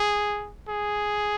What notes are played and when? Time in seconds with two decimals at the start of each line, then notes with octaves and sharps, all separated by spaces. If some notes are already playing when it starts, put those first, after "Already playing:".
Already playing: G#4
0.69 G#4